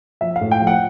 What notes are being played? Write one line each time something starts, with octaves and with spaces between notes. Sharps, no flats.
F3 E5
F5
A2
G5
F3
F#5